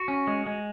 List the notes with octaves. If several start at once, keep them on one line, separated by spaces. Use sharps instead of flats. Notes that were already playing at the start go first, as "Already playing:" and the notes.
Already playing: F#4
C#4
G#3
G#3